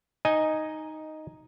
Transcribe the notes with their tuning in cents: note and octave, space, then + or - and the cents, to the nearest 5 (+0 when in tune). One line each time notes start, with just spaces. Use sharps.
D#4 +0 D#5 +0 G#5 +0